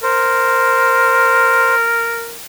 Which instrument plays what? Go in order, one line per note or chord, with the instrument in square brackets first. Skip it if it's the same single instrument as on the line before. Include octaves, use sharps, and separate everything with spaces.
[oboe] A#4 [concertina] C5